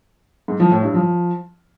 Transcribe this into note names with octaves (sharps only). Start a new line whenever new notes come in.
G#2
F3
A2
G2
F3